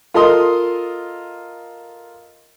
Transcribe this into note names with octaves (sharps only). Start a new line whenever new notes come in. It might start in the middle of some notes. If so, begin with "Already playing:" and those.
F4 A4 A#4 D#5 C6 D#6